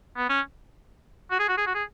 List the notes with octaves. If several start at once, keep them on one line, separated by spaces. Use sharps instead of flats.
B3
C#4
F#4
G#4
F#4
G#4
F#4
G#4